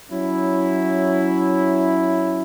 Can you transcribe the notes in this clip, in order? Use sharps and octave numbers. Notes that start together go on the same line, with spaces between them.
F#3 C#4 E4